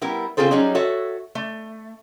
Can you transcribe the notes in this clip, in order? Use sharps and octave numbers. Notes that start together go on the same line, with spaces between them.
G3 B3 E4 A#4
C#3 C4 F4 G#4 A4 C5
F#3 G3 C#4 D#4 G#4
F#4 A4 C#5 E5
A3